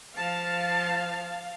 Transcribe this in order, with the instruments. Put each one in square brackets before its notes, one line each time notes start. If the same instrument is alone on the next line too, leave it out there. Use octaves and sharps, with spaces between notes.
[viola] F3 A5 [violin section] F5